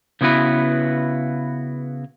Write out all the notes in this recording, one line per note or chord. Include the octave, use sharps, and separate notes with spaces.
C#3 B3 E4 F#4 B4